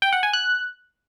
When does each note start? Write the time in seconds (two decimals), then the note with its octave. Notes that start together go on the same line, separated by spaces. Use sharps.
0.02 G5
0.13 F#5
0.23 G#5
0.33 F#6